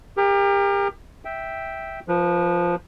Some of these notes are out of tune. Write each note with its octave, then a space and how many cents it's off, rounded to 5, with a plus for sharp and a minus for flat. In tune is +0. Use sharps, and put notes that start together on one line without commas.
G4 +35 A#4 +0
E5 -5 G5 +0
F3 +0 B4 -30